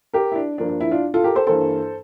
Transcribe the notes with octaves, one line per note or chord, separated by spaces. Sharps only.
G4 A#4
E4
D4
G2 F3 A#3 D4
D4
E4
D4 F4
F4 A4
G4 A#4
A4 C5
G2 E3 A#3 A4 C5